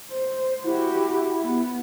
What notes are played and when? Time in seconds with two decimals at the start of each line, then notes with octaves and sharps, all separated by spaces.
0.10 C5
0.64 E4 F#4 G4
1.42 B3